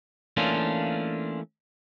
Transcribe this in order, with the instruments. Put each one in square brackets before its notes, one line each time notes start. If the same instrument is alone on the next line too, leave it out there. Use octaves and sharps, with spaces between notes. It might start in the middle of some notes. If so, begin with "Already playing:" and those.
[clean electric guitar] E3 A3 A#3 C#4 D4 F4